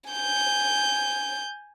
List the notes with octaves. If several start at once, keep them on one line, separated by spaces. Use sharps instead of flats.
G#5 G6